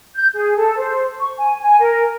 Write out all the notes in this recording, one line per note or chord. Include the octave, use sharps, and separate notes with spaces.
G6
G#4
A4
C5
C#6
G#5
G#5
A#4